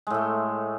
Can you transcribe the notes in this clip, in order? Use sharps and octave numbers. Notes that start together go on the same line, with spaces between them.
A2 G#3 A3